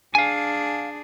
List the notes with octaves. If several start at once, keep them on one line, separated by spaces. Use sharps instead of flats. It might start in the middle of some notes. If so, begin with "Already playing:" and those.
D4 G#4 F5 G#5